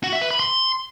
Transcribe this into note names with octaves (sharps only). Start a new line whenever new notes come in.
F#4
E5
B4
B5
C6